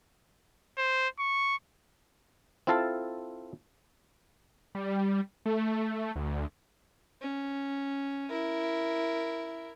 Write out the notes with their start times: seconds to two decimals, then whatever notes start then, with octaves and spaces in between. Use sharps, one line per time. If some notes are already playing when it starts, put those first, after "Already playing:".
0.78 C5
1.19 C#6
2.67 C4 E4 F4 A4 F5 A5
4.75 G3
5.46 A3
6.16 D2
7.21 C#4
8.29 E4 A#4